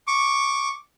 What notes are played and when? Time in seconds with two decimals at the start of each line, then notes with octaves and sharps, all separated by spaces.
0.07 C#6 D6